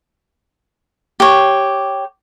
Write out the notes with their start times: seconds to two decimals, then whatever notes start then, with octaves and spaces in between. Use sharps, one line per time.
1.20 G4 C#5